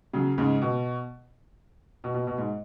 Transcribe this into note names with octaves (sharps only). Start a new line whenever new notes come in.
C#3 F#3
G#2 C#3
B2
B2
B2
B2
G#2